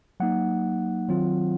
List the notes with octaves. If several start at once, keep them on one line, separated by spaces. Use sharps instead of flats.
F#3 A#3 D#4 F#5
D#3 F#3 C4 F4